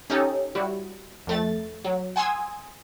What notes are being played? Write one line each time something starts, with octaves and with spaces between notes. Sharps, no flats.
C#4 D#4 G4 A4
G3 E4 F#4
F2 A3 A6
F#3
F#5 G#5 C6 D#6 E6 G#6